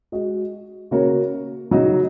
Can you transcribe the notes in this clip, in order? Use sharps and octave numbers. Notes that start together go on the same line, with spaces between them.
G#3 F#4 D#5
C#3 A#3 F#4 A#4 C#5
C#3 F#3 D#4 F#4